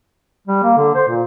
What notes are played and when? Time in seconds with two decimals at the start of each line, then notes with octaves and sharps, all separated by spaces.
0.47 G3
0.63 A#3
0.78 D3
0.95 C5
1.08 A#2